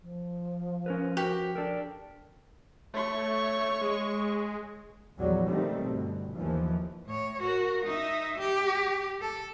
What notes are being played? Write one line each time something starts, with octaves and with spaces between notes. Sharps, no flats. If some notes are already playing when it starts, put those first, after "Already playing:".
F3
C#4 A#4 B4
F#4 G4 A#4
D4 A4 A#4
A3 C#5 C#6
G#3
A#1 E2 F#3 G3
A#2 D#3 G3 A3 C4
G1 B2
D#2 E3 F3
A2 C#5
F#4 A#4
D#4 E5
G4
A4